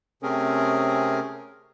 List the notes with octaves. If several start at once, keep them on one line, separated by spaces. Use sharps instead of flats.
C3 A3 C4 C#4 G#4 A#4